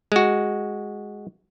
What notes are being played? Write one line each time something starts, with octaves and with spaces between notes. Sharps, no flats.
G#3 F#4